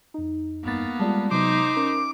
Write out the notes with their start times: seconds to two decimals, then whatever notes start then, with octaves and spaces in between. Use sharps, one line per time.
0.14 F2 D#4
0.64 G#1 G2 A#3 B3 A6
0.99 G3 G#3 F4 D5 A5
1.31 C3 F#3 G#3 B3 D#4 C5 D6
1.77 C#4 A#4